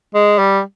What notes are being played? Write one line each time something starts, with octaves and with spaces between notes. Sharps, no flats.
G#3
G3